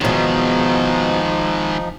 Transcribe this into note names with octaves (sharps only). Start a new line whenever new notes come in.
E2 B2 D#3 F3 G#3 D#4